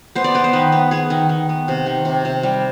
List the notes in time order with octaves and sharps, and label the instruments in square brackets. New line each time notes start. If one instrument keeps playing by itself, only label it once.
[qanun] B3 C5
D5
B3 D#5
C5
D#3 B4
B3
B3 G#4
D#3
D#3
B3
C3
D#3
C3
C3
G3